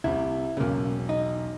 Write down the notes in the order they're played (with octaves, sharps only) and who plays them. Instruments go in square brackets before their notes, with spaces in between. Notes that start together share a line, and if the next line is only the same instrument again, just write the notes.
[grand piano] C2 C3 [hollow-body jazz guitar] E4
[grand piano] E1 B1 [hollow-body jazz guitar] C#3 A#3
[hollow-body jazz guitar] D#4